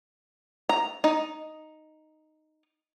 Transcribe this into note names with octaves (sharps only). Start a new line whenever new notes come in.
A#5
D#4